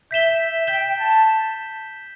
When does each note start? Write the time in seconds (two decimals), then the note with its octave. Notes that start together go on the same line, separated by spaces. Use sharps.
0.11 E5 G6 B6 E7 G7
0.67 G5 G6 B6 E7 G7
0.97 A5